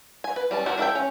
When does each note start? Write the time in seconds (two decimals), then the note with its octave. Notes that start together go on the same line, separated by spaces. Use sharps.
0.24 G#5
0.36 B4
0.51 G3 C#4 A5
0.66 E4 F#4 G4 A#4
0.78 D4 E4 A4 G5
0.95 C#4